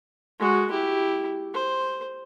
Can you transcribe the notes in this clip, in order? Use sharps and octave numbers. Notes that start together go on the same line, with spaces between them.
G#3 F#4
E4 G4
C5